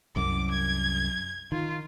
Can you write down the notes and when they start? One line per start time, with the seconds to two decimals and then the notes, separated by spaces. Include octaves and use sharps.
0.16 C2 F#2 D6
0.51 G#6
1.52 D#3 F4